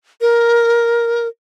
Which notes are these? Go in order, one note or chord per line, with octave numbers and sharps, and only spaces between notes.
A#4